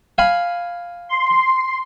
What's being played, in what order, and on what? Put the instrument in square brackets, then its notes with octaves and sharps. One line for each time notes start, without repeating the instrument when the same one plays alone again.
[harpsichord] F5 G#5 B5
[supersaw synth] C6